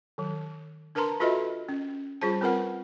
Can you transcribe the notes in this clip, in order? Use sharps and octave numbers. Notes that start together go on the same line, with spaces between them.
D#3 F#3
D4 A#4 B4 A5 A#5 C6
F4 F#4 A4 B4 D#5 E5
C#4
G3 F4 G#4 C5 A5
C4 F4 A#4 B4 F#5